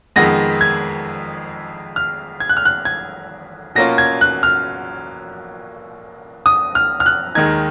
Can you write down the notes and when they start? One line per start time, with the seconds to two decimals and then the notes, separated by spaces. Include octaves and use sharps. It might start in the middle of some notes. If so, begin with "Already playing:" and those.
0.16 F2 D#3 G#3 B3 A#6
0.61 G#6
1.96 F6
2.40 G#6
2.49 F#6
2.57 F6
2.65 F#6
2.85 G#6
3.75 B2 A#3 C#4 F4 A#6
3.98 G#6
4.21 F#6
4.43 F6
6.46 D#6
6.75 F6
7.00 F6
7.06 F#6
7.35 D#2 D#3 G#3 D#4 G#6